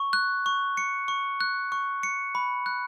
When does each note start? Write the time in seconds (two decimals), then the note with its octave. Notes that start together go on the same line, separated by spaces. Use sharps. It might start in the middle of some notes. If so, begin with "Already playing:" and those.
Already playing: C#6
0.13 F#6
0.46 C#6
0.77 C#7
1.08 C#6
1.41 F#6
1.72 C#6
2.03 C#7
2.35 B5
2.66 F#6